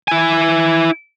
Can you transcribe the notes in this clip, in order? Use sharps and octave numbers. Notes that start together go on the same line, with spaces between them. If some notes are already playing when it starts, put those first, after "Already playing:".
E4 G#5